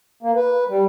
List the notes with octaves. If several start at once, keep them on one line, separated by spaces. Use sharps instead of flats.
A#3
B4
G3